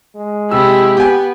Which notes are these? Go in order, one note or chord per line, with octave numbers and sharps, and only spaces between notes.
G#3
C3 E4 G4 E6
B3 G4 G#5